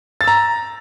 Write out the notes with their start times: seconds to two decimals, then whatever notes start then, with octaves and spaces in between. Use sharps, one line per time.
0.21 A6
0.24 E6
0.28 A#5